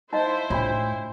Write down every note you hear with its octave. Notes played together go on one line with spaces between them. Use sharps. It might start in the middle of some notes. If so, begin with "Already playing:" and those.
D#4 E4 C5 D#5 F5
A2 D4 F4 C#5